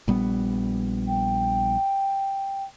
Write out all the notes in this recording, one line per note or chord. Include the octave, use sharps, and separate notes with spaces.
A#1 G3 B3
G5